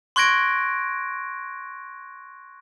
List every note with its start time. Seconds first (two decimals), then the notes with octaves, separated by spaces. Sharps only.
0.16 C6 C#6 F#6 G#6 A#6 D7